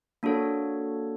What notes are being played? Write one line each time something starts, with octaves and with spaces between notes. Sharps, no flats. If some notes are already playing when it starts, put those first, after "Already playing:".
A#3 D4 F#4 A4 C#5